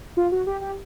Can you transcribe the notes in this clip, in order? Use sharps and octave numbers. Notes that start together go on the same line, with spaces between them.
F4
F#4
G4
G4